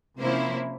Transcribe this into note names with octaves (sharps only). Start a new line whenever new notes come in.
C3 F3 A#3 C#4 E4 C5